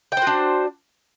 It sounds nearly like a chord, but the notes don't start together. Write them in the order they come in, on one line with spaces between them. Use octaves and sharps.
G5 C5 F#4 D4